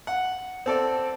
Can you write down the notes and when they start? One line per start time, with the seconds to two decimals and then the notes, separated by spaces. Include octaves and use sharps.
0.07 F#5
0.66 C4 A4 D5